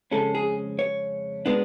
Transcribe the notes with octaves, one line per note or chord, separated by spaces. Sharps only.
F2 C#3 G#3 C#4 A4
G#4
C#5
B2 G#3 B3 D4